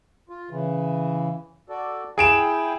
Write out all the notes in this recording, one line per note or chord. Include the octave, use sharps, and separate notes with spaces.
F4
C#3 E3
F#4 A4 D5
E4 G#4 G5 D7 E7